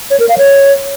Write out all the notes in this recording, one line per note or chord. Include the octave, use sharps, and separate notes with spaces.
C#5
A#4
F5
C#5